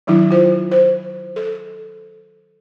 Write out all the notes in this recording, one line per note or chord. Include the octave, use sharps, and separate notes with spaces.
D#3 F#3 D4 E4
F4 C5
C5
A4